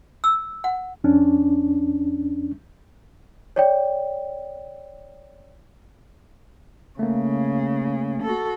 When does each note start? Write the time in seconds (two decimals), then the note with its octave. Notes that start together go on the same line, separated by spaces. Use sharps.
0.24 E6
0.64 F#5
1.04 F2 C#4 D4
3.56 C#5 D5 G5
6.99 C#3 A3 A#3
8.23 F#4 A4